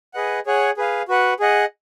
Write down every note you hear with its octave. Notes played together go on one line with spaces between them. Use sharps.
G#4 B4 D#5 F#5
G#4 C#5 F#5
G#4 B4 F5
F#4 B4 F#5
G#4 D#5 F#5